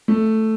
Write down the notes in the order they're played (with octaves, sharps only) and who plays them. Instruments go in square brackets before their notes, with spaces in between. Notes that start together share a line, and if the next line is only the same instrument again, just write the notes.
[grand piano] A3